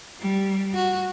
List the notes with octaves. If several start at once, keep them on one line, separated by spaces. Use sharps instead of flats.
G3
F#4